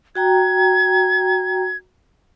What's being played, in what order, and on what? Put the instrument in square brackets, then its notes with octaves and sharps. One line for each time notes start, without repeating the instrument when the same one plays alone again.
[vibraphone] F#4 G5 A#5 [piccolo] G#6